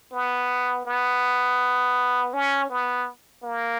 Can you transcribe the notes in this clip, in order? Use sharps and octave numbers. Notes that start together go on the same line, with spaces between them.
B3
B3
C#4
B3
A#3